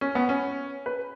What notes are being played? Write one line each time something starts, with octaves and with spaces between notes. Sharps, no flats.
C#4
B3
C#4
B4